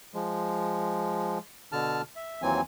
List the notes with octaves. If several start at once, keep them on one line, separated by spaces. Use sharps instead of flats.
F3 G#3
B2 D3 A5 F6
E5
D#2 E3 F#3 C4 G#5